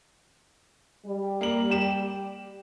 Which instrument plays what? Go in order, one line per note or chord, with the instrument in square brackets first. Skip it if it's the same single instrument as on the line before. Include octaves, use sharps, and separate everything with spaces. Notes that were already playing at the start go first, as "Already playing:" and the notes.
[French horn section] G3
[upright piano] A#3 F#7
G4 E7